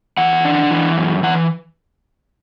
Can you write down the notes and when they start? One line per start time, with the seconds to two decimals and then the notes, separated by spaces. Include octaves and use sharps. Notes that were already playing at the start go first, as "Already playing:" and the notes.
0.17 E3 F#5
0.45 D4
0.71 E3
0.97 F#2
1.23 E3 F#5